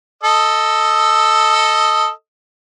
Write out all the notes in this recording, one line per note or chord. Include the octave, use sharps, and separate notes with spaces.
A4 D#5 E6